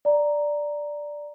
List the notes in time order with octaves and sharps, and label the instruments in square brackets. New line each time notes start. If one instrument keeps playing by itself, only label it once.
[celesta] D5 A#5